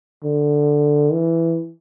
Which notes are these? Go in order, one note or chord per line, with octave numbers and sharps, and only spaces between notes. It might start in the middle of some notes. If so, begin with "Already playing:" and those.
D3
E3